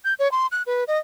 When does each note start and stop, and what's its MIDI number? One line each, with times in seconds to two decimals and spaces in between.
0.04 0.14 91
0.19 0.31 73
0.32 0.47 84
0.52 0.63 90
0.67 0.84 71
0.88 0.98 75